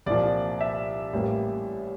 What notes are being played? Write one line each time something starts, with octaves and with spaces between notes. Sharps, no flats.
C2 A#2 F3 D5
E5
A1 A2 G3 A#3